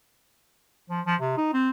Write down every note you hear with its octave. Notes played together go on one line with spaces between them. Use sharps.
F3
F3
C3
D#4
C4